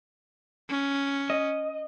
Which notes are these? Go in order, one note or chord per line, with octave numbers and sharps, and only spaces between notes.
C#4
D#5